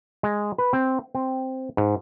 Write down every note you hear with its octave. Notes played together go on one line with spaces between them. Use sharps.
G#3
B4
C4
C4
G#2